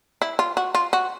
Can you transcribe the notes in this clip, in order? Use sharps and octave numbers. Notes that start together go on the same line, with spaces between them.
E4
F4
F#4
F4
F#4